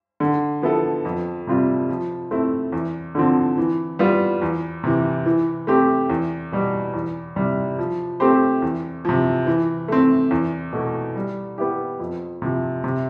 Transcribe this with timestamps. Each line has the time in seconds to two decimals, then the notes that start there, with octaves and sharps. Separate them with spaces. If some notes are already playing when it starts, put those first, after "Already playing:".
0.20 D3
0.62 F3 B3 E4 A4
1.05 F2
1.47 C3 G3 C4 F4
1.89 F3
2.31 A3 C4 E4
2.73 E2
3.15 D3 F3 C4
3.58 E3
3.99 G3 B3 F4
4.42 E2
4.84 C3 E3
5.26 E3
5.67 A3 C4 G4
6.10 E2
6.52 B2 G3
6.94 E2
7.36 C3 G3
7.79 F3
8.20 A3 C4 G4 C5
8.62 E2
9.05 C3 F3
9.47 E3
9.88 A3 C4
10.31 E2
10.73 B2 A3
11.16 G3
11.58 B3 E4 G4
12.00 F2
12.42 C3 F3
12.84 C3